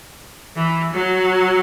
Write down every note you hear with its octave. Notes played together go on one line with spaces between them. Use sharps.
E3
F#3